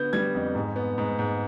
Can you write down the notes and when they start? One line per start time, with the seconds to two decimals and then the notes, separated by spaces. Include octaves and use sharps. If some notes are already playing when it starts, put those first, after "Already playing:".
Already playing: D3 B3 G6
0.13 G3 G#6
0.35 F2
0.55 G#2
0.76 B3
0.98 G#2
1.19 G#2